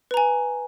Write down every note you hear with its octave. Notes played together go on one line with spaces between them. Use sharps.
B4 G#5 A#5